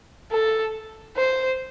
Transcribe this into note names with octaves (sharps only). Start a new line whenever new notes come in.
A4
C5